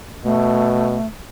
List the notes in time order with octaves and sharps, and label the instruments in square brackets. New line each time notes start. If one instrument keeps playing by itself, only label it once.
[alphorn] B2 [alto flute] A3